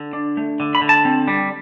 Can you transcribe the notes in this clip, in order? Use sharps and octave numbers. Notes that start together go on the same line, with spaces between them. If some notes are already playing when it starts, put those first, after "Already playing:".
Already playing: D3
D4
A3
D3
B5
D3
A5
C4
G3